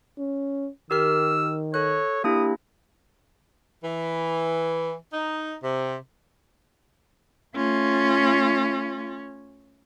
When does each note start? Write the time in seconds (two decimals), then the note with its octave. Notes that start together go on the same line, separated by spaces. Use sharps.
0.18 C#4
0.91 D#3 G4 A#4 E6 F6
1.74 A4 C#5 F#6
2.24 A#3 D4 E4 G4 D#6
3.84 E3
5.13 D#4
5.63 C3
7.55 A3 C#4 F4